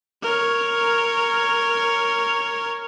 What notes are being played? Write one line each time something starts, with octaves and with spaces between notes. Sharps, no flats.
A#4 C#5